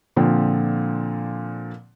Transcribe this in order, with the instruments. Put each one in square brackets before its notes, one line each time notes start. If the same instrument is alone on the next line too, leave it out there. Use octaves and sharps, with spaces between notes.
[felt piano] A#2 D3 F3 C4